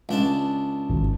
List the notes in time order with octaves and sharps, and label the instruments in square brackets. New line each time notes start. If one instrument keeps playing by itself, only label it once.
[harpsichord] C#2 D4 A5
[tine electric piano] G#1